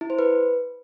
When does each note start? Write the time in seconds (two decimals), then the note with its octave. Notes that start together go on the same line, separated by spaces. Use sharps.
0.01 E4
0.10 C5
0.19 B4